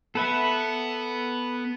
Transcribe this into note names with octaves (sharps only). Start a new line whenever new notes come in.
B3 A4 B4 E5